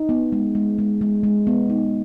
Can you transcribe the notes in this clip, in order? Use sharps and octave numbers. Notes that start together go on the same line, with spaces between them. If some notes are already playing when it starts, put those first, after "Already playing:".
Already playing: D#4
B3
G#3
G#3
G#3
G#3
G#3
B3
D#4